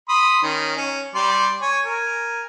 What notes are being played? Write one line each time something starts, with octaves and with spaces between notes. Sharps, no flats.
B5 C6 D#6
D#3 C#4
C#4
G3 D5 C6
C#5 G#5
A#4 G#5